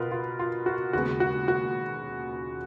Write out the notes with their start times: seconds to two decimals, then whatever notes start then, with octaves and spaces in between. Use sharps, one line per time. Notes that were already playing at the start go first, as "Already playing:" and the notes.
Already playing: B2 B3 F4 A#4 B4
0.11 F4
0.39 F4
0.66 F#4
0.93 D#2 C#3 G#3 B3 F#4
1.20 F#4
1.48 F#4